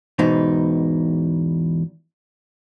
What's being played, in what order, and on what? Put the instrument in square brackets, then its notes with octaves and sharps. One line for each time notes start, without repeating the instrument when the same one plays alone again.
[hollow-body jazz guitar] E2 G#2 B2 D#4